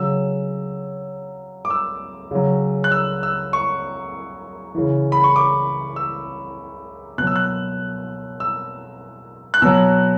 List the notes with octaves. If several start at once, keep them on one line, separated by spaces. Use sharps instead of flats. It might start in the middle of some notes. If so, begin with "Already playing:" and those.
Already playing: C#3 F#3 E6
D6
E6
C#3 F#3
F#6
E6
E6
C#6
C#3 E3
B5
C#6
D6
E6
B2 F#3 F#6
E6
F#6
E6
F#6
B2 F#3 E6